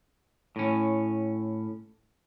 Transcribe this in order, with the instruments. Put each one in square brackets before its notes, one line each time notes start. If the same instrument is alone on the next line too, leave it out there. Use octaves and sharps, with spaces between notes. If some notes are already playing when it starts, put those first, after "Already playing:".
[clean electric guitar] A2 C#4